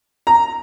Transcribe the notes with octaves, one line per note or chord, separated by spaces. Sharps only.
A#5